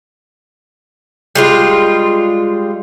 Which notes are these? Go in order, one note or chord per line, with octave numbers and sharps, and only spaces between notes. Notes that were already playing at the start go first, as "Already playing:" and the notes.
G3 G#3 F4